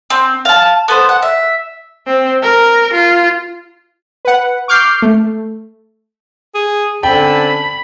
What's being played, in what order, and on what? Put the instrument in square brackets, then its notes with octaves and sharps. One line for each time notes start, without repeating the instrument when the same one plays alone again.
[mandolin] C4
F5 A5
B3 A4 C5
F#5
E5
[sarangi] C4
A#4
F4
[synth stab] B4 F#5
C#6 D6 F6 G6 C7
A3
[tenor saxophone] G#4
[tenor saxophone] D3 [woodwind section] C4 C#4 A5 [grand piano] G5 [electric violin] B5